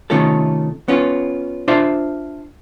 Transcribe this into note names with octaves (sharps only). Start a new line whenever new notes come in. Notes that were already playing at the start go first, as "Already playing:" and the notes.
C3 D#3 A3 C#4 F4 A4
B3 C#4 F4
D4 F4 C5 E5 F5